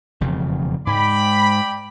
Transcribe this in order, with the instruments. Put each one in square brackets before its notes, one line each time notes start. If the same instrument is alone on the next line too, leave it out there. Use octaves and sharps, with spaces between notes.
[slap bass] E1 F2 C#3
[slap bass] G#2 G#3 [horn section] D5 G5 B5